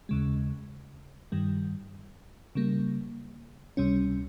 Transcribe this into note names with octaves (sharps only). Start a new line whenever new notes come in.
D#2 C#3 G#3
G2 D#3 G3
C#3 G3 A#3
C#2 C3 G3 C#4